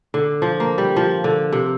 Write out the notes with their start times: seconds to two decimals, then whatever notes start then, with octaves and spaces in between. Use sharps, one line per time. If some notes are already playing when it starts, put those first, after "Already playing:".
0.14 D3
0.42 F3
0.60 A#3
0.78 G3
0.96 F3
1.24 D3
1.53 C3